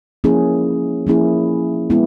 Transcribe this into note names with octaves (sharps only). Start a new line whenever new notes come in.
F3 A#3 C#4 E4 G#4
F3 A#3 C#4 E4 G#4
G#3 B3 E4